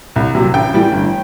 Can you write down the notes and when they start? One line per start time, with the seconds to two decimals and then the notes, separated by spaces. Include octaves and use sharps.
0.16 C2
0.35 C3 F#3
0.54 A1 G5
0.74 A2 E3 G3
0.92 G1